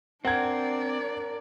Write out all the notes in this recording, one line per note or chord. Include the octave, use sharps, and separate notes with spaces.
C4 D4 A#4 D5 F#5 G#6